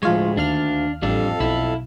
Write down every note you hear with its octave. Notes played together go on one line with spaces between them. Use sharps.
D2 A2 F3 G#3 F4 C#5
D#2 D4 F5 F6
A1 F2 G3 D4 A4 F5
B1 E4